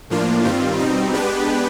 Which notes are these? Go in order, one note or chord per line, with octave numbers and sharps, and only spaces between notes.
A2 F3 A#3 D4 F4
G2 D#3 G3 C4 F4
B2 G3 C4 D#4
G#3 B3 D4 G4 B4